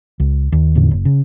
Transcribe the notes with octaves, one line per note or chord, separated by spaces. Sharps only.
C#2
D#2
F1 E2 A2 D3
F#1
C#3